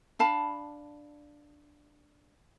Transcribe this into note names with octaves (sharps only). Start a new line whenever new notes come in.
D4 F5 A5 B5